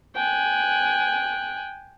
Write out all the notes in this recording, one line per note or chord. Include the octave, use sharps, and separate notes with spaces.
G5 G#5 F#6